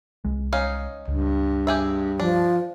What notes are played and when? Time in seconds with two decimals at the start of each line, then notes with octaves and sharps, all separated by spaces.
0.25 C2 G#3
0.53 C#4 D#4 F5
1.08 C#2 G2
1.67 G4 G#4 E5
2.20 F3 D4